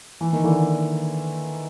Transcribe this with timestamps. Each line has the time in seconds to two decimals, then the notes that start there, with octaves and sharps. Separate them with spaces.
0.21 E3
0.33 D#3
0.44 D3 E3